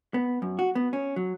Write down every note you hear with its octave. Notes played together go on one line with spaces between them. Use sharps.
B3
F#2
F#4
B3
C#4
F#3